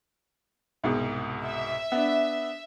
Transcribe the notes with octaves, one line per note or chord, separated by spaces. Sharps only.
C2 G#2 B2
E5
B3 D4